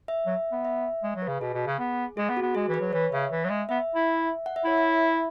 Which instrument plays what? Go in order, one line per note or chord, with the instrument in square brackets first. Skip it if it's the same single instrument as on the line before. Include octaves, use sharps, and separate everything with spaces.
[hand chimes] E5
[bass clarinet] F#3
B3
[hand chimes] E5
[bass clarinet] G#3
F#3
[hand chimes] B4
[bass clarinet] C#3
[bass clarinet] B2 [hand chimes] G#4
[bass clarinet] B2
C#3
B3
[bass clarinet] G#3 [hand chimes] G#4
[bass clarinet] B3
[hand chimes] F#4
[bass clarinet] B3
[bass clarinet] G#3 [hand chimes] G#4
[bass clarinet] E3
[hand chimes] B4
[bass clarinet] F#3
[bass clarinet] E3 [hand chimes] C#5
[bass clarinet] C#3 [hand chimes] E5
[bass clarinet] E3
F#3
G#3
[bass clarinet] B3 [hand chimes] E5
[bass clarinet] E4
[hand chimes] F#5
E5
[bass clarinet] E4 [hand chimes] C#5
[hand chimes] E5